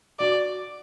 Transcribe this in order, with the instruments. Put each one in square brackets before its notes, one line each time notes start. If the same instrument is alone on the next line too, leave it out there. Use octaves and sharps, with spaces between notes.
[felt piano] F#4 [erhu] D5